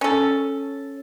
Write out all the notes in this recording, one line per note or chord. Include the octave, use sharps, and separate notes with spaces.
C#4 A4